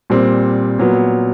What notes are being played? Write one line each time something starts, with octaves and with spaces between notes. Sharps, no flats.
A#2 G3 C4
A#2 F#3 B3